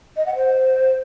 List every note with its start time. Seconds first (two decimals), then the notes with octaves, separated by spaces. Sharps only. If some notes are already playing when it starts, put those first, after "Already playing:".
0.17 D#5
0.26 F#5
0.36 C5